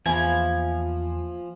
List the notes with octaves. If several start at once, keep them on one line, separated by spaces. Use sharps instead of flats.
E2 E3 F3 A#3 E4 G#5